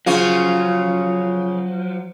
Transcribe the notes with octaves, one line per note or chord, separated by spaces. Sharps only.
C#3 F3 F#3 C#4 F4